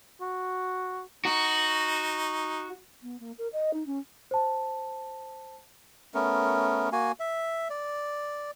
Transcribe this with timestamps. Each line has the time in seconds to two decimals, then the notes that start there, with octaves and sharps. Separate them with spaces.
0.21 F#4
1.25 D#4 F#4
3.02 B3
3.19 A#3
3.38 A#4
3.52 D#5
3.73 D#4
3.86 C#4
4.31 C5 A5
6.14 A3 B3 C#4 A#4
6.92 A#3 F#4 G#5
7.20 E5
7.70 D5